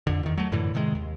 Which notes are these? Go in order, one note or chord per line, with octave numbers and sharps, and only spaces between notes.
F2 D3
E2 D#3
F#3 A3
F#2 A2 D3 E3
A2 C3 D#3 G#3
D#2